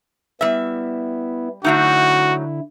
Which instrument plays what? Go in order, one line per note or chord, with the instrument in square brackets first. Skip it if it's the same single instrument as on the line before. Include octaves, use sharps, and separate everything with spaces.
[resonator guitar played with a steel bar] G3 E5 [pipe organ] B3 E4
[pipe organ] D3 E4 [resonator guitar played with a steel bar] F#3 A3 D#4 [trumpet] F#4